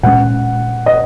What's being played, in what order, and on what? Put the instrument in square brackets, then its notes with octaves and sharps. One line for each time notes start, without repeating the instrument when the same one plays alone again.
[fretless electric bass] A#2 G#3 C#4 [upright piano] F#5
[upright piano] D#5